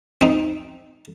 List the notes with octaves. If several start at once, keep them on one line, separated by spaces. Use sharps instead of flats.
C4 D#4